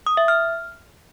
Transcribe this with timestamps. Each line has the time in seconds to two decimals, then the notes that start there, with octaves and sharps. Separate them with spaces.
0.07 D#6
0.17 E5
0.28 F6